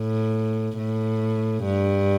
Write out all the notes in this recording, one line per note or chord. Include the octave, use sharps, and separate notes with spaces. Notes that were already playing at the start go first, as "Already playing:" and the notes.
Already playing: A2
A2
G2